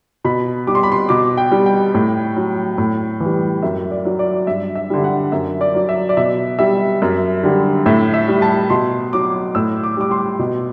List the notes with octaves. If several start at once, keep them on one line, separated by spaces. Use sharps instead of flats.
B2 B5
G3 D6
C6
B5
C6
B2 D6
G5
G3
G5
A2
F#3
A2
E3
G3
F#2 E5
D5
F#3
D5
G2 E5
E5
D3 G3
F#5
F#2 E5
D5
F#3
E5
D5
B2 E5
G3 E5
F#2
D3 G3
A2 E5
E5
G3
A5
B2 C6
F#3 D6
A2 E6
D6
G3 D6
C6
B2